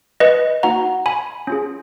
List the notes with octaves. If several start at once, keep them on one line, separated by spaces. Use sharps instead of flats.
B4 D#5
A#3 D#4 F#4 F#5 A#5
G#5 B5
C#4 F4 G#4